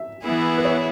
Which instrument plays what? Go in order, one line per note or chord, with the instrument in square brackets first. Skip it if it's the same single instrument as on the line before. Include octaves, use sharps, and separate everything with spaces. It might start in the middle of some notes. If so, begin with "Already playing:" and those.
Already playing: [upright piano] E5
[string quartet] E3 B3 E4 G#4
[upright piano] B4
C#5